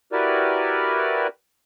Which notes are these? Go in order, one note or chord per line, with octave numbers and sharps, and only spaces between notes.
E4 F#4 G4 A#4 B4 D5